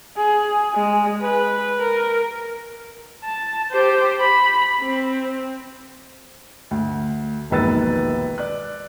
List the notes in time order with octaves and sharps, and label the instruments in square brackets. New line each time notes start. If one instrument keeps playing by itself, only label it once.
[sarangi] G#4
G#3
B4
A#4
[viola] A5
G4 C5
B5
C4
[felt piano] D2
E1 A#1 D#3 B4 E6 A6
D5 F#6